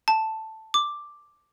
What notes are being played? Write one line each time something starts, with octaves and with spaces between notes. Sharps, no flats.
A5
D6